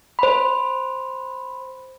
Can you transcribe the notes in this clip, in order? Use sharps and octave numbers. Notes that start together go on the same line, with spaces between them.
C5 B5